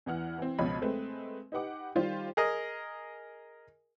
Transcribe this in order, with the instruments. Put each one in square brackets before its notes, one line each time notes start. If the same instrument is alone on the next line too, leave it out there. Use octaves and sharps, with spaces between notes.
[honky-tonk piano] E2 E3 F#5 F6
E3 C4
C#2 B2 F3 C#5 D#5 B5
G#3 A3 C4 B4
D#4 G4 B4 F#5 D6
D#3 G3 F4 G4 C5
[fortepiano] G#4 A#4 D#5